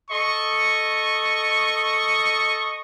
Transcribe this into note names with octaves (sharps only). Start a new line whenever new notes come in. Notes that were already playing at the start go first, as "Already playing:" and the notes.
A4 D#5 C#6